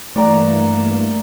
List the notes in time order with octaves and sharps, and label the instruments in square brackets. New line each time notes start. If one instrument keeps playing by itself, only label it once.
[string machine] G2 E3 A#3 [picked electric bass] A3 [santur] D5 F#5 A#5